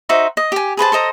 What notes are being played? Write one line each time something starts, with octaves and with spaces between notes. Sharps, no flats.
D#4 F#4 C5 E5
D#5
G4 G#5
G#4 B4 C5 A5
A4 C5 D#5 A#5